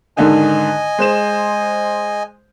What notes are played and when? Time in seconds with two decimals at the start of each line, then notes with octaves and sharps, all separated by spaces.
0.17 G#2 D3 D#3 D#5 G#5
0.98 G#3 C5 E7